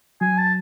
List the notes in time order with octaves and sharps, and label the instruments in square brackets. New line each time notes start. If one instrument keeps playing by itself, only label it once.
[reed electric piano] F#3 [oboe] G#5
[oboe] A5